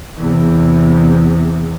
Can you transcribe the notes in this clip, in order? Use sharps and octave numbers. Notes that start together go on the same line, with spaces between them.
E2 C3